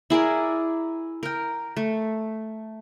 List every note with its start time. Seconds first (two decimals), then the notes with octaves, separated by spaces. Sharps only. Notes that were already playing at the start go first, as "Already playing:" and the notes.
0.10 E4 G#4 A#4 D5
1.23 A#4 G5
1.77 A3